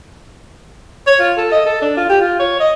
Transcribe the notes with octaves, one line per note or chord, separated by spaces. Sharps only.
C#5
F4
A4
D#5
A4
D4
F4
G4
F4
C#5
D#5